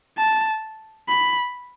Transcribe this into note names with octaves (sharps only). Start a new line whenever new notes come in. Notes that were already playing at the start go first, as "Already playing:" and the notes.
A5
B5